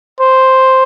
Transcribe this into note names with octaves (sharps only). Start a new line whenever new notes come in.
C5